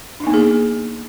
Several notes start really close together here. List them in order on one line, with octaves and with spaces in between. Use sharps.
D4 D#4 B3 A#3 G#4